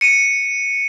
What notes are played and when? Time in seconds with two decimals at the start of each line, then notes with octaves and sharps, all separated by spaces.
0.01 C#7 D#7